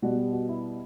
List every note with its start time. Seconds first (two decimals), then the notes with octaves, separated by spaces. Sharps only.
0.02 B2 G3 B3 F#4
0.17 G4
0.33 F#4
0.49 E4